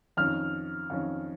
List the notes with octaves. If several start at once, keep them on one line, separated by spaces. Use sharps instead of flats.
F2 D#3 C#4 F6
F2 D#3 C#4